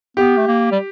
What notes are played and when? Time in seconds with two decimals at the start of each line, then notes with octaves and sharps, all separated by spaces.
0.17 B3 G4
0.37 A3
0.47 A#3
0.72 G3